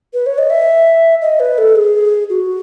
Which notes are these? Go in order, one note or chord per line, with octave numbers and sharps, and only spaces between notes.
B4
C#5
D#5
E5
D#5
B4
A4
G#4
F#4